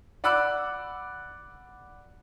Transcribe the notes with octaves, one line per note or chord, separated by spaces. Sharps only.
D5 F#5 B5 D6 E6 F#6